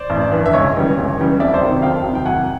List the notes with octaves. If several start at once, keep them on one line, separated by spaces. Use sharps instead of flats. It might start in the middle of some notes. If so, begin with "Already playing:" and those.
Already playing: C5 D5
A1
G2 E3
E5
C#2 C#5 D#5
C#3 E3 G3
C#2
C#3 E3 G3
F2 D5 E5
C5 D5
C3 D#3 F#3
F2 F5 G5
C3 D#3 F#3
G5
C2 F#5 G#5